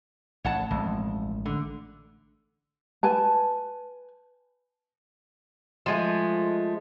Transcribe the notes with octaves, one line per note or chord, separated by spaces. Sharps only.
A1 C#5 F#5 A5
A1 F2 G#3
D3
B4 G#5 A5
F3 G#3 A3